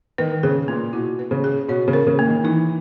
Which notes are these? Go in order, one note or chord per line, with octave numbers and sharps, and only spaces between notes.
D#3 B4
C#3 G#4
A#2 A#3
B2 E4
B4
C#3
G#4
B2 C#5
C#3
A#4
C#3
A#3
D#3
E3 D#4